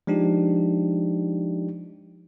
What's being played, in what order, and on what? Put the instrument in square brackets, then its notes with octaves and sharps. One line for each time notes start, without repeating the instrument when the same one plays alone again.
[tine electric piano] F3 G#3 D4 D#4 G4